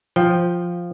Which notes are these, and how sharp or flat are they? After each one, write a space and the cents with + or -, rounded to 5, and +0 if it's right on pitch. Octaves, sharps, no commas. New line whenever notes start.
F3 +0 G5 +0